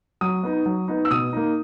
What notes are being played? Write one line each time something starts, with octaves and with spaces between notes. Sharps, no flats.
F#3 D#6
B3 D#4
F#3
B3 D#4
E6
B2 D#6
A#3 D#4